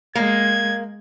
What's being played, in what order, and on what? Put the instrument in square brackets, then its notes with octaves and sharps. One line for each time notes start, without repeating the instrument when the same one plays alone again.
[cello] G#3 [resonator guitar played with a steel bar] A#3 [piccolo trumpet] G#6